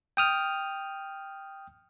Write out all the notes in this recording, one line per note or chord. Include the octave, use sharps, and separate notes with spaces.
G5 D#6 F6